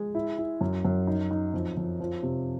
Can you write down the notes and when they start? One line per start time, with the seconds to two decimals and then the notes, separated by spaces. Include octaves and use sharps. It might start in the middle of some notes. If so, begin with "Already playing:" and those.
Already playing: G#3
0.15 E4
0.38 E4
0.61 F#2
0.85 F#2
1.07 D#4
1.31 D#4
1.54 F2
1.77 F2
2.00 F3
2.23 C3